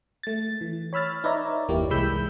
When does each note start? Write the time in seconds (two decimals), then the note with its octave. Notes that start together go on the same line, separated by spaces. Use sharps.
0.23 A3 A6
0.61 E3
0.93 C#5 B5 E6 F6 A6
1.24 D#4 B4 C#5 D5 E5 A#5
1.68 G1 E2 A#3 E4 G4
1.90 C2 E3 G#3 B5 E6 G6